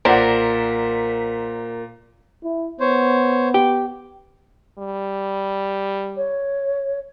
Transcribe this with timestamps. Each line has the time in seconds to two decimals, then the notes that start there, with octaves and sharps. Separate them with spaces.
0.05 B1 A#2 A#4 C5 D5 F#5 B6
2.43 E4
2.80 B3 C5 C#5
3.54 G4
4.79 G3
6.17 C#5